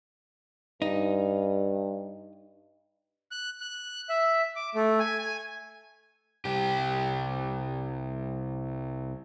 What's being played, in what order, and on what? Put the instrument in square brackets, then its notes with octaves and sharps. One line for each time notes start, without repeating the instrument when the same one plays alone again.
[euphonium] G2 [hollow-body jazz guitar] D#4
[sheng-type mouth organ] F#6
F#6
E5
D6
A3
G#5
G#5
[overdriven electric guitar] C2 G4